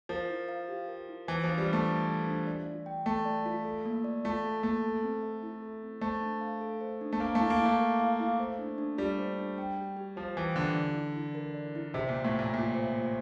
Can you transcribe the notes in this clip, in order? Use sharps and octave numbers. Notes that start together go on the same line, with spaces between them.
F3 A#4
E4
F5
G4
A#4
E4
E3 C5
F3 D4
G3
A3 D4
A4
C5
D4
D5
F4
G5
A3 A4
D5
F4
A4
A#3
D5
A3 F4
A4
A3 A#3
A4
C4
E5
E4
A4
C4
A3 C5
D4
F5
A4
C5
D4
A3
A#3 F5
A3
E4
A#3
E4
A3
A#4
F5
E4
C5
D4
D4
G3 F4
C5
D4
G5
G4
G4
F3 C5
E3 G5
D3 G4
D5
E4
E4
A#4
D5
E4
C3 C5
A#2 A#3
A2
A#2 E5
A#2 F4
C5
A#3